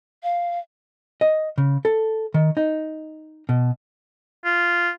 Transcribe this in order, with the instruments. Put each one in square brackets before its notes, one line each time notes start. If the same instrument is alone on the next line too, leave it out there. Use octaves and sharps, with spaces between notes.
[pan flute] F5
[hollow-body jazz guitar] D#5
C#3
A4
D#3
D#4
B2
[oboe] F4